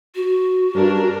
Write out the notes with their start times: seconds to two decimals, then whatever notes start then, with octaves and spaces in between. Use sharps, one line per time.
0.15 F#4
0.75 G2 C#4 D4 A#4